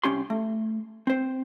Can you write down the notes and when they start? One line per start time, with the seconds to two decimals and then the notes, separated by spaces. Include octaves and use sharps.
0.04 C2 C#4 G4 C6
0.30 A3
1.07 C4 C5